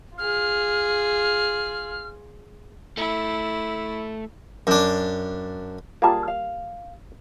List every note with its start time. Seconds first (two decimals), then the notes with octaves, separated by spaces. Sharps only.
0.18 F4 G#4 F6
2.97 A3 E4
4.67 F#2 D4
6.02 G3 A#3 F4 G#4 A5
6.28 F5